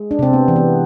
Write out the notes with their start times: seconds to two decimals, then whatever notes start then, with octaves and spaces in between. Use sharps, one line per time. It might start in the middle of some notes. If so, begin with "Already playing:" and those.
Already playing: G#3
0.11 D4
0.19 C3 C4
0.33 B3
0.48 E3
0.56 B3